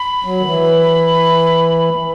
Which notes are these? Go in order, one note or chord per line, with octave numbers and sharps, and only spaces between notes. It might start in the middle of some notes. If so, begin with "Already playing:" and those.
Already playing: B5
F#3
D#3
E3